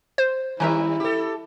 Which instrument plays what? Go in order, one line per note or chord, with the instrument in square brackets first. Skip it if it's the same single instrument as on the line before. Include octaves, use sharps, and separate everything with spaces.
[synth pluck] C5
[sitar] D#3 G3 [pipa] C#4 A#4 E5 [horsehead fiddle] E4
[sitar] G4 A4